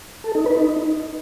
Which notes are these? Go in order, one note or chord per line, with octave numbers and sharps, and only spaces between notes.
A4
D#4
B4
D#4